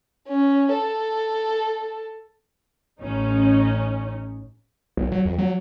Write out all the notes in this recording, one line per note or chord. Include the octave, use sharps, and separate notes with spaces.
C#4
A4
A1 C#4 D#4
B1
F#3
F2
F#3